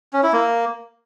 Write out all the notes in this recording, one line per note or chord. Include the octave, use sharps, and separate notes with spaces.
C#4
E4
A#3